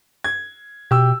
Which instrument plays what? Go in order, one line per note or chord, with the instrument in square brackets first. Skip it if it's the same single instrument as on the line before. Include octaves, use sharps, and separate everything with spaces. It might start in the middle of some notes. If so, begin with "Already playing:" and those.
[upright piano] G#6
[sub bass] B2 [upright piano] G4 E6